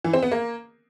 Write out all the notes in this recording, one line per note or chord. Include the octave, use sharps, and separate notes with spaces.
E3
C4
B3
A#3